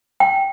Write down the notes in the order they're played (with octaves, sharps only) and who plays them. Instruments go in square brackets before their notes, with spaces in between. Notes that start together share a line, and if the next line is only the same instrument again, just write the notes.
[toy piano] G5